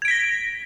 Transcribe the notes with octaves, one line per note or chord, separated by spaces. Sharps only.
G#6 A#6 B6 D7